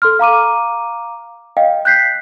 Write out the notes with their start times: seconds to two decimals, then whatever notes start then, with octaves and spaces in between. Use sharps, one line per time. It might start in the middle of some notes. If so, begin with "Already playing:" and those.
0.02 A4 C6 F6
0.19 F5 A#5 D6 D#7
1.57 D#5 F5 G5
1.85 F#6 G6 B6 C7